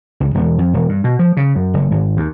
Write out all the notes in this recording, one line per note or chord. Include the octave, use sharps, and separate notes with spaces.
C#2
E1
F2
E1
G2
B2
F3
C#3
F#2
F#1
G#1
D#2